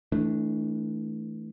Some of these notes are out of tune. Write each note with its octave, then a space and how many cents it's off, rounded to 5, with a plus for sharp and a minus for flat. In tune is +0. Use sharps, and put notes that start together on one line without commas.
E3 -25 A3 +0 D4 +0